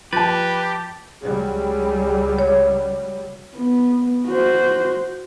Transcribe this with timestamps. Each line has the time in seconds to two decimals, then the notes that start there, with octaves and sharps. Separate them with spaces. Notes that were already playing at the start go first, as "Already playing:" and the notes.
0.13 F3 G4 B4 A5 A6
1.23 C#2 F#3 G3 G#4
2.39 C#5
3.56 B3
4.28 F#4 C5